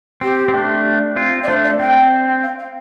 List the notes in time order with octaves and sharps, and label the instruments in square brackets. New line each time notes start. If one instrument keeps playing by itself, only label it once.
[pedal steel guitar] C4 [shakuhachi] G4
[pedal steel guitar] C4
A3 D4
C4 F4
[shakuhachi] D5
[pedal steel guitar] A3 D4 [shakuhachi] C5
[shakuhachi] D5
[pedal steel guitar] C4 [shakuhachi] G5
[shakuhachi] F5
F5